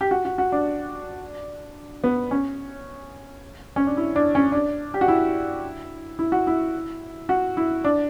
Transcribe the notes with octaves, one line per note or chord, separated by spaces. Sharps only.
G4
F#4
F#4
F#4
D4
B3
C#4
C#4
D4
E4
D4
C#4
D4
G4
F#4
E4
E4
F#4
E4
F#4
E4
D4